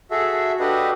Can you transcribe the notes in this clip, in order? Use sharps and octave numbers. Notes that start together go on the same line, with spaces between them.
F#4 G#4 A4 E5
D4 F#4 G4 A4 B4 D#5